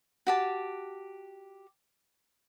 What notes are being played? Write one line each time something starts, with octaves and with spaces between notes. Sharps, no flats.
F#4 G4 A5